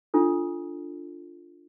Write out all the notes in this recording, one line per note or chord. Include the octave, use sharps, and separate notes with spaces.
D4 F4 A4